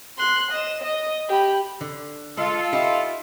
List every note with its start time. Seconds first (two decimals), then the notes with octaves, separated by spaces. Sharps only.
0.18 C6 F#6
0.51 D#5 E7
0.83 D#5
1.28 G4 B5
1.81 D3
2.37 G#3 F4 A4
2.73 D#4 E4 G4